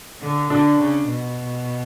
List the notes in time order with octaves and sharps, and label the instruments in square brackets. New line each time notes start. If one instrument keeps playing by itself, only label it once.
[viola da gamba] D3
[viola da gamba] D3 [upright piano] D4
[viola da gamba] C#3
B2